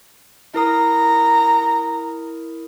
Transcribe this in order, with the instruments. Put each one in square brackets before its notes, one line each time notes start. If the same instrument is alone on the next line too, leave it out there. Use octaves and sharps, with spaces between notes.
[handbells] E4 A#4 D#6 [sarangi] A#5